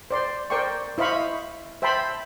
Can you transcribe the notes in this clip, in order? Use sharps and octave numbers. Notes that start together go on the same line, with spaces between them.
C5 D5 C6
A#4 C5 D5 G5 C6 C#6
E4 C5 D#5 F5 B5 C#6
C5 E5 G5 A5 B5 C6